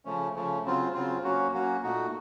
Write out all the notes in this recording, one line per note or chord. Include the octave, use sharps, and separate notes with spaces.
C#3 F3 A3 C#4
C#3 F3 A3 C#4
C#3 F#3 C4 F4
C#3 F#3 C4 F4
F#3 A#3 C#4 F#4
F#3 A#3 C#4 F#4
A#2 A3 D#4 F#4